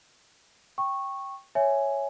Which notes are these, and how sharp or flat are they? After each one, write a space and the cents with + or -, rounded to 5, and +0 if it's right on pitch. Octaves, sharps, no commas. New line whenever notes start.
G5 +0 C#6 -10
C#5 +0 E5 +0 G#5 +0